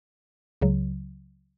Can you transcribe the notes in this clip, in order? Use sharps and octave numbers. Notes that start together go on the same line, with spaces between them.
C#2 C#3 F#3